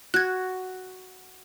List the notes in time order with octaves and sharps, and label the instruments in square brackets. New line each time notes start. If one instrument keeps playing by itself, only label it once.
[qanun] F#4 [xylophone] F#6 G#6